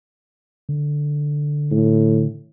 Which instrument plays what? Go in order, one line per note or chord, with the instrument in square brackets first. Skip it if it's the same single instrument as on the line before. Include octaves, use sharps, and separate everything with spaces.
[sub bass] D3
[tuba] A2